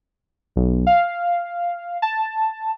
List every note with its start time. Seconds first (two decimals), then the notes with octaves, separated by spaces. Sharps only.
0.56 B1
0.87 F5
2.02 A5